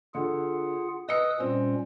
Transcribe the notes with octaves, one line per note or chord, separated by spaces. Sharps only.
D3 F4 G#4 F#5
B4 D#5 D#6 E6 C#7
A#2 G3 C4 C#4